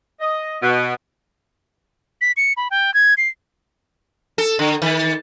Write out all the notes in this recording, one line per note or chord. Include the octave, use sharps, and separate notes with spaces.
D#5
B2
B6
C#7
B5
G5
G#6
C7
A4
D3
D#3